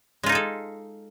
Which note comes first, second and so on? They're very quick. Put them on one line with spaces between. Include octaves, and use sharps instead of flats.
G#3 F4 D#4 G#4 A4